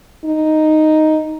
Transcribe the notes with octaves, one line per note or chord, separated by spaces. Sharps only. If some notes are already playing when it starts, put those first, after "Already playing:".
D#4